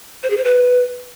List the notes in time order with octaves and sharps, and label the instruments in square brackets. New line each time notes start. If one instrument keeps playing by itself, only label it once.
[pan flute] C5
G#4
C5
B4